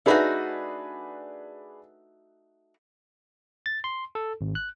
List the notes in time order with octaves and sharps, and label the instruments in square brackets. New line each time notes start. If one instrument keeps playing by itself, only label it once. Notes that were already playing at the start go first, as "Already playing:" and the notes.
[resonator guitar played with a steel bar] A3 D#4 F#4 [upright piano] D4 G#4 B4
[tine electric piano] A6
C6
A4
G#1
F#6